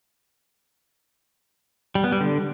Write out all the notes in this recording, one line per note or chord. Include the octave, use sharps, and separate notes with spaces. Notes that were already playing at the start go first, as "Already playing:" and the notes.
G3
B3
G3
D3